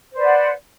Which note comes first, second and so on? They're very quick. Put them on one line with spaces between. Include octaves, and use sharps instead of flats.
C5 B4 D5 F#5